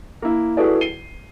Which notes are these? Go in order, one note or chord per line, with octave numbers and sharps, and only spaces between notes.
A#3 E4
E4 F#4 G#4 A4 B4 D5
C7 D#7 G7